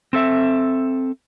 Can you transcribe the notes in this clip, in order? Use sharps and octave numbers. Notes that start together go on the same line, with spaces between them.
C4 A4 E5